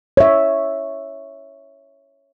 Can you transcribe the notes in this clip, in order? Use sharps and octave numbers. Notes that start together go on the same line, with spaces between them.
C#5 E5